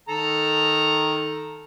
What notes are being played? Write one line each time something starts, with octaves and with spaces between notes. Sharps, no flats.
D#3 A4 A#5